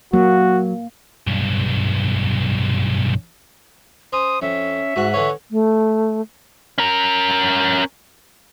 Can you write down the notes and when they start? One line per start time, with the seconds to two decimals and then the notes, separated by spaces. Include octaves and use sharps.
0.13 F#3 A#3 F#4
1.27 B1 G2
4.13 C#4 C5 D#6
4.42 F2 C#4 E5
4.96 G#2 F#4 F#5
5.14 D3 E3 C#4 C#5
5.50 A3
6.78 C#4 A#4